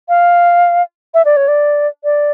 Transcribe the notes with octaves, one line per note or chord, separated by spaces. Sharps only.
F5
E5
D5
C#5
D5
D5